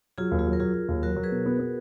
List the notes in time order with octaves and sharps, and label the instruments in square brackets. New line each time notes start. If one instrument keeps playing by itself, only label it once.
[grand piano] F#3 [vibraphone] F4 G#4
[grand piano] D#2
[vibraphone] F4 G#4
[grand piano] F#3
[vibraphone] A#4
[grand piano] F#3 [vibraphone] F4 G#4
[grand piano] F#3
D#2
[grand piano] F#3 [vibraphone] F#4 A#4
[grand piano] F#3
[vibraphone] G#4 B4
[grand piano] B2
B3
B3